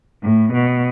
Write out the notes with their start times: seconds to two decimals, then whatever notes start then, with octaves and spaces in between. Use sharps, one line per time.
0.23 A2
0.52 B2